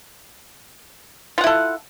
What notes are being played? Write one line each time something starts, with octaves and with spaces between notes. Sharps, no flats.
E4 F4 A4 F#5